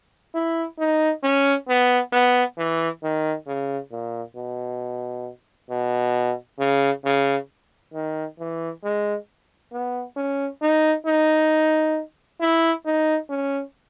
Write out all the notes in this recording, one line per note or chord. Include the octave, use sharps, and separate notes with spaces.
E4
D#4
C#4
B3
B3
E3
D#3
C#3
A#2
B2
B2
C#3
C#3
D#3
E3
G#3
B3
C#4
D#4
D#4
E4
D#4
C#4